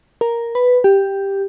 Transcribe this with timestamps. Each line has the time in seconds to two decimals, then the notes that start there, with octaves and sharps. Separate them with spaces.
0.21 A#4
0.55 B4
0.84 G4